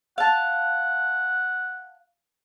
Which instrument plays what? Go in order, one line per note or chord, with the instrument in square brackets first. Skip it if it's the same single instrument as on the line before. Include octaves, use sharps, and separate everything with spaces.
[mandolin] F5 A5 [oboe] F#5